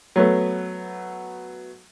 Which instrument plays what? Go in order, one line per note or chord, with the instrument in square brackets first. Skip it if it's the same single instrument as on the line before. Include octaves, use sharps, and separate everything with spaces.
[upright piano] F#3 A3 B3